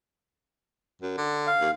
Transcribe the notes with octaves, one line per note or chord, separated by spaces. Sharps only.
F#2
D3
F5
D#2